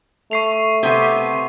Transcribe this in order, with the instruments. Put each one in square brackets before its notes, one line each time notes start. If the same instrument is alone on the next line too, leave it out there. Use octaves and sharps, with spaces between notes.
[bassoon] A3 [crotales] C#6 C7 F7
[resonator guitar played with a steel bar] C3 B3